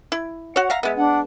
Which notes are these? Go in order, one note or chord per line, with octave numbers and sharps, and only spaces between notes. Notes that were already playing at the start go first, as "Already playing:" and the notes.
E4
F#4 C#5 F#5
E5 F5 A#5
G#3 B3 E5
D4 F#5